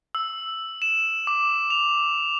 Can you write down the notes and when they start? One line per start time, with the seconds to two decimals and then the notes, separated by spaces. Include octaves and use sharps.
0.15 E6
0.82 E7
1.27 D6
1.70 F7